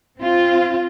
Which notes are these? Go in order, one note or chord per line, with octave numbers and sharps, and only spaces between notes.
C4 F4